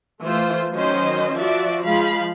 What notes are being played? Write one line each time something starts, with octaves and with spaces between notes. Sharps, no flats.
E3 A3 F4 C5
D#3 F#3 C#4 C5 D#5
F3 F#4 D5 E5
F3 G#3 F5 B5